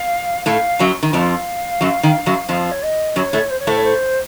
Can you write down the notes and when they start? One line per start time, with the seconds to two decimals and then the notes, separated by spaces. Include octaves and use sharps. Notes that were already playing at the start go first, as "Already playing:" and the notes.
Already playing: F5
0.46 A2 A3 F5
0.79 F#2 F#3
1.03 D#3
1.13 F2 F3 F5
1.81 F#2 F#3
2.03 D#3
2.26 F#2 F#3
2.48 F2 F3 F5
2.71 C#5
2.83 D#5
3.16 F#2 F#3 C#5
3.33 A2 A3
3.50 C5
3.59 C#5
3.67 A2 A3 C5
3.76 C#5
3.84 C5